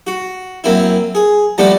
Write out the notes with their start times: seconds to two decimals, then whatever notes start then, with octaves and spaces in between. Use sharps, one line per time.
0.07 F#4
0.64 F#2 A#3 C4 E4
1.15 G#4
1.58 F3 G3 A3 B3 D4 F#4